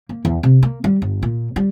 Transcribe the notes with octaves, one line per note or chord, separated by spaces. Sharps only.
A#3
E2
C3
A#3
G3
G1
A#2
G3